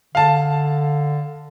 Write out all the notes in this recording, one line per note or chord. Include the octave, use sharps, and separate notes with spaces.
D3 F5 A5